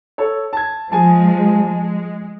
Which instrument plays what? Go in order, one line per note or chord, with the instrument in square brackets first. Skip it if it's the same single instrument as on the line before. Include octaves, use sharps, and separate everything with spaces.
[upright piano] A4 C#5
A5 G#6
[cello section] F3 G#3 [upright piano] G#4 G#5 A5
[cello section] G#3